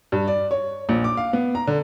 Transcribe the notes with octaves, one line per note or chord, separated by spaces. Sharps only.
G2
D5
C#5
A#1
D6
F5
B3
A#5
D3